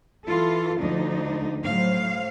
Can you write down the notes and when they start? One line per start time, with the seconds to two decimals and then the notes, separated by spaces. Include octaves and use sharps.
0.25 E3 F4 A4
0.79 D2 F3 D4 D#4
1.64 A2 F#3 C5 F5